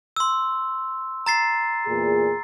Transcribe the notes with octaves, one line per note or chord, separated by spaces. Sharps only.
C6 E6
A#5 A6 C7
E2 A#2 G#4